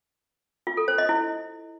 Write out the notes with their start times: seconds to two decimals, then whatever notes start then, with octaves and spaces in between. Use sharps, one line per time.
0.67 F4
0.77 A4
0.88 C5
0.98 D#5
1.09 E4